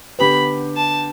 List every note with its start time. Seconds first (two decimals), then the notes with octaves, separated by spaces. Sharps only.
0.19 D3 B3 G4 B4 B5
0.76 A5